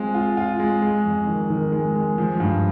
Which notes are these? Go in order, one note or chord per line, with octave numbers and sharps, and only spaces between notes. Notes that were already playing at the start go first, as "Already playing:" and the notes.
Already playing: G#3 C4 F4
F4
F4
G#3
G#3
F2
D#3
D#3
G#3
G#3
F3
G2